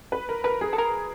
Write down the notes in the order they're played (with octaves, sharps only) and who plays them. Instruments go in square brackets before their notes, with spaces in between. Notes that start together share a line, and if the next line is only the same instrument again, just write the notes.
[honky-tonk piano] B4
A#4
[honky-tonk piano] A#4 [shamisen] B4
[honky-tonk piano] G#4
[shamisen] A4
A#4